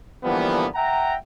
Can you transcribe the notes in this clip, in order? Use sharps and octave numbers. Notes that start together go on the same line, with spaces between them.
D3 E3 F3 G3 A#3 B3
E5 F#5 G5 A#5